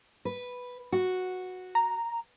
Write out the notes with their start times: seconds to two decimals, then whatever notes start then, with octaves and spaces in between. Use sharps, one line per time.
0.25 B4
0.92 F#4
1.75 A#5